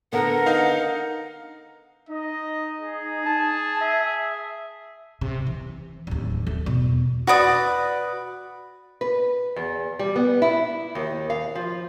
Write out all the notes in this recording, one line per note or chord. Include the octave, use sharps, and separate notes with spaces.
D3 B3 A#4 F#5
D#4 F5
D#4 D#5
G#4
A5
E5
C3
E3
D1 D#2
A3
E2 B2
F#4 B4 D5 D#6
B4
E2
G3
B3
E4
D#2
F5
F3